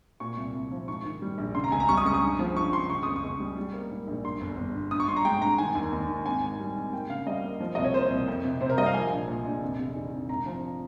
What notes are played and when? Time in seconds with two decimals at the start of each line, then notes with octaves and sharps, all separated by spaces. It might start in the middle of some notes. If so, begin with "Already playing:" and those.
0.20 A#2 C#6
0.37 C2
0.55 C2
0.71 F3
0.88 G#2 C#6
1.05 D#3
1.22 G3
1.38 A#1
1.55 C#3 C6
1.64 A#5
1.72 C#2 G#5
1.80 A#5
1.89 G3 C#6
1.97 D#6
2.05 C#2 C#6
2.14 D#6
2.23 G2
2.39 F3
2.56 G2 C#6
2.73 G2 C6
2.90 C#3 C#6
3.03 C#2 D#6
3.16 C#6
3.24 C#2
3.40 G3
3.57 G3
3.74 A#3
3.91 G#2
4.07 A#1
4.24 G2 C6
4.41 G1
4.57 G1
4.74 G2
4.91 G2 D#6
5.00 C#6
5.08 G2 C6
5.16 A#5
5.25 G#3 G5
5.42 G2 A#5
5.58 D#3 G#5
5.75 D#2
5.93 D#2
6.09 D#3
6.26 G#1 G#5
6.43 G#2
6.60 G3
6.76 G#2
6.92 A#3 G5
7.10 C#3 F5
7.27 G3 D#5
7.43 A#3
7.60 F3
7.75 C2 D#5
7.84 C#5
7.94 A#3 C5
8.10 C2
8.28 F2
8.45 C3
8.61 C3 C5
8.70 A#4
8.78 G3 D#5
8.86 F5
8.94 F3 G#5
9.12 A#1
9.28 A#2
9.45 A#1
9.62 F1
9.79 F1
9.95 D#3
10.13 F1
10.29 G#1 A#5
10.46 F3